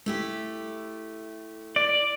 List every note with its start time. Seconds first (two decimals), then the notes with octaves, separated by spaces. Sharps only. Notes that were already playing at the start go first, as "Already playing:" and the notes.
0.06 A3 E4 G4
1.76 D5